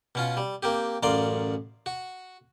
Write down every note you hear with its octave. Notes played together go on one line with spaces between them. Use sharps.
B2 C#4 F4
G3
A#3 C4 G4
A1 F#2 D5 F5 A#5 C6
F#4